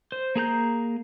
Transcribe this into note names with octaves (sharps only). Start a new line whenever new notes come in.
C5
A#3 G#4 A#5 G6